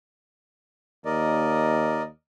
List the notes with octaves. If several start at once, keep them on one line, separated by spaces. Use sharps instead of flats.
D#2 A#4 D5 D#5